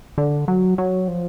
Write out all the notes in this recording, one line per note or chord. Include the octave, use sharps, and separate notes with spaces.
D3
F#3
F#3
F3